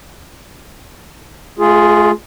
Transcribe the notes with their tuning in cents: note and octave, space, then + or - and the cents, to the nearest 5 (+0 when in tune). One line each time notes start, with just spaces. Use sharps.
A3 -45 F4 +0 G#4 +0